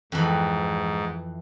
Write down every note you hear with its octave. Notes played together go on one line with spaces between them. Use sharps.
F2 G#2 E3